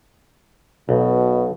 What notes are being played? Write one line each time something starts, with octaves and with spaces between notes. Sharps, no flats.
B1 B2